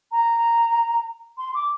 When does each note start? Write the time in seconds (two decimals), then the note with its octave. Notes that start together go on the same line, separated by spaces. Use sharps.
0.12 A#5
1.38 C6
1.54 D6